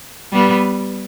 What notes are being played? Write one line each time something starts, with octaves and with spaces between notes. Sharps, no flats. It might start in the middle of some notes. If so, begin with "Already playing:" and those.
G3 B3